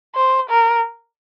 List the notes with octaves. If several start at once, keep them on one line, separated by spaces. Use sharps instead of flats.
C5
A#4